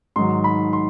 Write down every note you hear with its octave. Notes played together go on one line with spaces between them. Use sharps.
G#2 D#3 F#3 C6
B5
C6